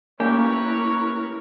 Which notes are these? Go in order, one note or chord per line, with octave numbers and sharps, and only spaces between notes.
A3 A#3 C#4 E4 G4 A#4 B4 C#5